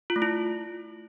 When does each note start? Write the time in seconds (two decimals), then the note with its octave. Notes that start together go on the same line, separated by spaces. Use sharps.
0.10 F4
0.16 A3
0.22 E4